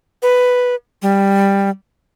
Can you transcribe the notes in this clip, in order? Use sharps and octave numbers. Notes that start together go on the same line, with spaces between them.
B4
G3